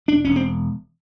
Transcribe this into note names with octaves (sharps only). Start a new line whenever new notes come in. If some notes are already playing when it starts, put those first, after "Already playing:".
E1 D4
E1 C#4
C4